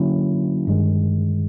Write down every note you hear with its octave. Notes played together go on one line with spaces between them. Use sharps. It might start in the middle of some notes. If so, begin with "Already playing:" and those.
Already playing: D3 F#3 A#3 C#4 E4
G2 D#3 G#3